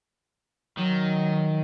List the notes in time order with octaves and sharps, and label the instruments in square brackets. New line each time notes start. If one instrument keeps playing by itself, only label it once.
[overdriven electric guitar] D#3 [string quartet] F#3